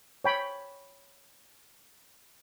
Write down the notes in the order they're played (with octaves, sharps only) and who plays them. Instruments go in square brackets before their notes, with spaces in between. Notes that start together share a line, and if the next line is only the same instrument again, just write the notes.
[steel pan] C#5 G5 B5